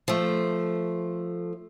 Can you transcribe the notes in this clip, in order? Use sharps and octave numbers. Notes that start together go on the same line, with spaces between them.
F3 A3